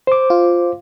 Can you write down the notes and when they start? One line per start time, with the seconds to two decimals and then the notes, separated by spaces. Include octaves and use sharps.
0.07 C5 D6
0.30 F4